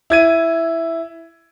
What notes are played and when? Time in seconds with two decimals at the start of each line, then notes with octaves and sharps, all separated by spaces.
0.10 E4 G#6 D#7